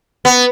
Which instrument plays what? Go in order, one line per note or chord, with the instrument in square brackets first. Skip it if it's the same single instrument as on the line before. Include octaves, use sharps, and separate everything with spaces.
[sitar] B3